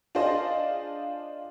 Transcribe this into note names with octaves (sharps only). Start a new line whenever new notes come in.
D4 F4 G#4 C5 D#5